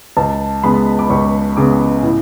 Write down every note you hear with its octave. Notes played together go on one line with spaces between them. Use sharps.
C#2 A5
C#3 G#3 B3 B5
D6
C#2 C#6
C#3 G#3 B3 D6
A2